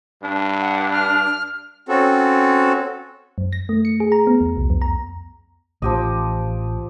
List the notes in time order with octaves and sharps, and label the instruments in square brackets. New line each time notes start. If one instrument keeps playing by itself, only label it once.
[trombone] G2 [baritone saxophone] D4
[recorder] F#5
F6
[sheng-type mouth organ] C4 C#4 F#4 A4
[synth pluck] F#2
A#6
A3
C#7
G#4
A#5
B3
E2
C2
F2
A#5
[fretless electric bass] A1 [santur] F3 G4 D#5